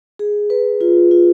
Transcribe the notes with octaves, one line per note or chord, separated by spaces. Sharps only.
G#4
B4
F4
F4